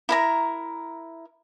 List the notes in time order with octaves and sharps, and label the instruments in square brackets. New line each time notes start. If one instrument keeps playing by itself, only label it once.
[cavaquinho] E4 A#4 A#5